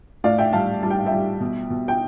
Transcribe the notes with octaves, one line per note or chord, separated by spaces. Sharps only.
A2 D5 F5
E5 G5
G3 F5 A5
G3 A5
G5
F5
E5 G5
G3
B2
B2
G5